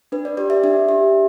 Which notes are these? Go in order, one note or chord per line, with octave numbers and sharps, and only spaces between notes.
D4 B4
D5
G4 D5
E5
D4 E5
G4